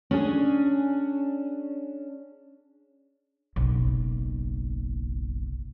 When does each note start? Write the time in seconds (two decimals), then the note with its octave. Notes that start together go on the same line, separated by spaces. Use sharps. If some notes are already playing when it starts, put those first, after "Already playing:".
0.11 C#4 D4 G#4
3.56 F#1 B1